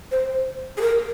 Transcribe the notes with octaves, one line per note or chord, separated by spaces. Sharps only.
C5
G#4
A#4